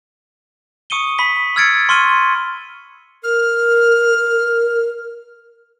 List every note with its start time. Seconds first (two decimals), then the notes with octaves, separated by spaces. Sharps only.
0.90 C#6 D#6 C#7 D#7 G7
1.18 B5 B6 G7
1.56 E6 F6 G#6 A6 C#7 D7
1.89 C6 C#6 F6 D#7 G7
3.24 A#4 F6